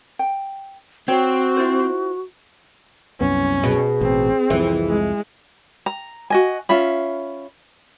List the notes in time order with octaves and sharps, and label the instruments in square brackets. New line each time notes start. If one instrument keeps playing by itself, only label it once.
[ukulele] G5
[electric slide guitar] C4 [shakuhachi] F#4 [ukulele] C#5 G5
[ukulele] E4 F4 C5
[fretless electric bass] C2 F#2 B3 [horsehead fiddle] C#4
[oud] B2 [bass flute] G#4
[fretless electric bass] A1 [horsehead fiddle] C4
[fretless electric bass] C2 F2 [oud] E3
[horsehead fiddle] G#3
[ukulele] A#5
F#4 D#5 G#5
C#4 F4 E5 B5